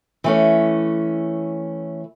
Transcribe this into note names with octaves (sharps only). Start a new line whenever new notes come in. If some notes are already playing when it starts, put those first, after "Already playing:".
E3 A3 C#4